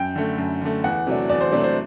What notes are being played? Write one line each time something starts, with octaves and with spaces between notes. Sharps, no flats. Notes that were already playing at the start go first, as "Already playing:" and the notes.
Already playing: F#2 G5
D3 A3
F#2
D3 A3
E2 F#5
C3 F#3 A3 D4
E2 D5
C5
C3 F#3 A3 D4 D5
C5